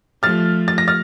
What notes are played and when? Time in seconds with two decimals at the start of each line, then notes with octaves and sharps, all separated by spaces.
0.23 F3 A3 F6 A6
0.68 A6
0.78 A#6
0.88 F6 A6